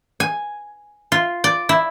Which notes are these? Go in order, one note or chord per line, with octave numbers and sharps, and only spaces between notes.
G#5
F4
D5
E4